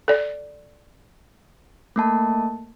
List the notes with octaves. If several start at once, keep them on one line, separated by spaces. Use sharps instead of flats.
A4 D5
A3 A#3 A5